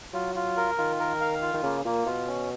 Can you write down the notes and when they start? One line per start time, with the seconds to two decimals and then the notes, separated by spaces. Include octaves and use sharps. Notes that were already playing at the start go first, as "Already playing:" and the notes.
0.13 F#3 F4
0.35 F4
0.57 A#4
0.78 D#3 F4
0.99 A#4
1.21 F5
1.42 F4
1.54 D#3
1.63 C#3 A#3
1.85 A#2 A#3
2.06 B2 F4
2.27 C#4